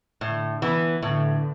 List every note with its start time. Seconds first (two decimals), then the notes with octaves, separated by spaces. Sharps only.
0.21 A2 D3
0.62 E3 B3
1.02 A2 D3